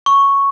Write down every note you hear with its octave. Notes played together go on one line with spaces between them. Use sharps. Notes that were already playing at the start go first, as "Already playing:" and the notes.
C#6